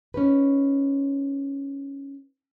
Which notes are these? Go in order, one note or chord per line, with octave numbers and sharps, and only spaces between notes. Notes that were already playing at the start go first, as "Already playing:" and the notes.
C#4 D#4 B4